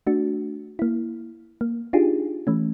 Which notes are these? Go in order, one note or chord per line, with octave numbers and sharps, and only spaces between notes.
A3 D4 F#4
A#3 E4
A#3
D4 D#4 F4 G4 G#4
E3 A3 C#4